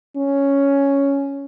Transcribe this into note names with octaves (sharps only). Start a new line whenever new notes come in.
C#4